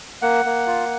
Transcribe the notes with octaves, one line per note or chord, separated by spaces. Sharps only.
A#3 F#5
A#3
F4